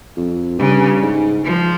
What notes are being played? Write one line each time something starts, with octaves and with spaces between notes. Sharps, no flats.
F2
G2 C#3
G#2
F3